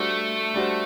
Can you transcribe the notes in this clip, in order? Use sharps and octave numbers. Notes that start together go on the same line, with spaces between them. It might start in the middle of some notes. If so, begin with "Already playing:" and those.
Already playing: G3 A3 D4 F#4 C5
G3 D4 F#4 C5